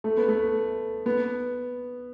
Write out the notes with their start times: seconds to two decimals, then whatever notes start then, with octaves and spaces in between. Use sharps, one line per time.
0.04 A3
0.17 B3
0.29 A3
1.06 B3